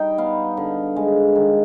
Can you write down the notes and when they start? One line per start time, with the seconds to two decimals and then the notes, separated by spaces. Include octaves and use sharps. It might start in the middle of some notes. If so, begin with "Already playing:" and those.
Already playing: G3 D#4 G5
0.18 B3 F5
0.57 D3
0.96 G#3
1.35 D#3